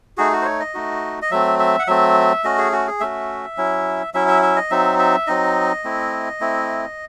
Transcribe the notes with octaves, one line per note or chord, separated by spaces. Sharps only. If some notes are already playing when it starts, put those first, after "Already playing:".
A3 D#4 F#4 G#4
F#4
C5
C#5
D#5
A3 D#4 F#4
D#5
F#3 A3 C4 E5
E5
F#5
F#3 A3 C4 E5
A3 C#4 F#4 D#5
G#4
F#4
G#4
A3 C#4 F#4 E5
F#3 C#4 E4
F#3 C#4 E4 E5
E5
E5
D#5
F#3 C4 D#4 E5
E5
F#3 C4 D#4 D#5
A3 C4 E4
A3 C4 E4